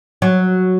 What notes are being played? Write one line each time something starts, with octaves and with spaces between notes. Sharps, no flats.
F#3